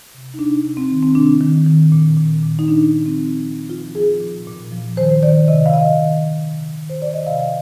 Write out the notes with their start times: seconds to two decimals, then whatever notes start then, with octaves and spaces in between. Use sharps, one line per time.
0.14 C3
0.34 D#4
0.39 C3 D4
0.64 C3
0.77 C4
0.90 D#3
1.03 C4
1.15 C3 D4
1.41 D#3
1.66 D#3
1.92 A#2
2.17 A#2
2.43 A#2
2.59 D#4
2.68 A#2 D4
2.94 F3
3.06 C4
3.19 A#2
3.44 F3
3.70 F3 F4
3.95 F3 G#4
4.21 A#2
4.47 A#2
4.72 F3
4.97 D#3 C5
5.23 D#3 D5
5.48 C3 D#5
5.66 F5
5.74 C3 D#5
5.99 D#3
6.25 D#3
6.50 C3
6.76 D#3
6.90 C5
7.01 D#3 D5
7.14 D#5
7.26 C3 F5